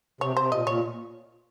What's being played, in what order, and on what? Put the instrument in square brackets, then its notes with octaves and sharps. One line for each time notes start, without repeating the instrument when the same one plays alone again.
[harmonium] C3 [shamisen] C#5
[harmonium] C3 [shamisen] C5
[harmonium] A#2 [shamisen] D#5
[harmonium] A#2 [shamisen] C#5